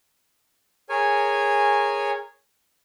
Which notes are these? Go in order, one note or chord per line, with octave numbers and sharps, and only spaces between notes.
G#4 A#4 C#5 G#5